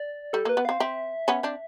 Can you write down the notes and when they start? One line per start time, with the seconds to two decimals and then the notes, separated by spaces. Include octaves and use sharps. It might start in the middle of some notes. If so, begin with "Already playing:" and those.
Already playing: D5
0.33 G3 A4
0.45 A#3
0.49 B4
0.57 B3
0.65 C4 F5
0.80 C4 E5
1.28 B3 C#4
1.43 C4 D4